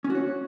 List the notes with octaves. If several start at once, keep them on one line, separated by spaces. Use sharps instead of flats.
C#4
F#4
C#5